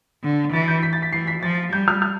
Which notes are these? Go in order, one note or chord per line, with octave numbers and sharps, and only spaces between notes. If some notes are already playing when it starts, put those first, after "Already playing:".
D3
E3 A6
G6
B6
A6
B6
E3 C7
B6
F3 A6
G3 G6
F6
F6